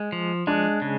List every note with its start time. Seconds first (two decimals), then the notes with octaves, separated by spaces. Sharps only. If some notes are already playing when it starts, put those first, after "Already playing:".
Already playing: G#3
0.12 F3
0.47 G#3 D4
0.82 C#3